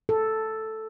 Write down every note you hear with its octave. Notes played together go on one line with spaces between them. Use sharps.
A4